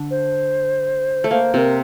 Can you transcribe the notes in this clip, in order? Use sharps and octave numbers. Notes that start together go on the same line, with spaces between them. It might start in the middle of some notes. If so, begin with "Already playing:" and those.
Already playing: D3 D4
C5
A3
A#3 C5
C3 C4 A#4 C5